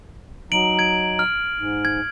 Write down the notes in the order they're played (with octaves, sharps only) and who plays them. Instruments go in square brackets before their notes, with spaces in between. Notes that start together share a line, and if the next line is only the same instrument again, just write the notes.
[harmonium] F#3 D#4 [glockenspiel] D7 F#7
[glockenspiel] G#6 D7
F6
[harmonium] G#2
[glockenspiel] G#6